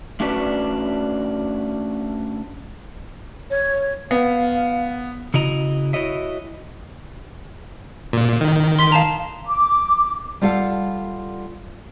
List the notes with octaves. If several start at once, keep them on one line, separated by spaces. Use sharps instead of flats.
A3 C#4 D4 F#4 B4 D5
C#5
B3 F5
C#3 E4 F#4 D#5 A#5
E4 F#4 C#5 D#5 E5
A#2
D#3
C6 B6 G7
F5 A5 A#5
D6
G3 F4 A4 F5 F#5